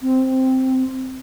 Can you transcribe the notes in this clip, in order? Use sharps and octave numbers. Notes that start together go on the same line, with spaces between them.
C4